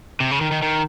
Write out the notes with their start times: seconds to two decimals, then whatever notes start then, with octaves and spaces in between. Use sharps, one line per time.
0.20 C3
0.31 C#3
0.41 D#3
0.51 D#3
0.62 D#3